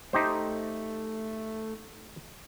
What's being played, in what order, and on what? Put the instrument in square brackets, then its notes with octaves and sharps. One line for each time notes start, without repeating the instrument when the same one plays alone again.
[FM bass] A3 [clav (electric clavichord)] D#4 G4 C5